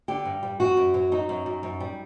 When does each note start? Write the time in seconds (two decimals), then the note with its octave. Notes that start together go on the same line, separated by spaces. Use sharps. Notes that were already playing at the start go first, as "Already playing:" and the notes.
0.08 D3 G4
0.25 G2
0.43 G3
0.60 F#2 F#4
0.77 F#2
0.94 F#3
1.12 F#3 D#4
1.29 F#2
1.46 F#2
1.63 F#2
1.80 G3